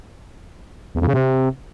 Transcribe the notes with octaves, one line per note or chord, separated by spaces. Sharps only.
E2
F2
C#3
C3